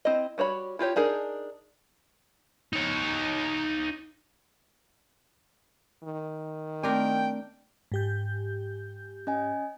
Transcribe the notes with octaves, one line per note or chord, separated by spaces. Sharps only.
C4 E4 D#5
G3 F#4 C#5 B5
E4 F4 G4 C#5
D4 D#4 G#4 A#4
D#4 C#5
D#3
A3 C4 D4 A#4 G5
G#2 G4 G6
C#4 D#5 G#5